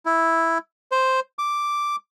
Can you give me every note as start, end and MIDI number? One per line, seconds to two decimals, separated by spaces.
0.06 0.58 64
0.92 1.20 72
1.39 1.96 86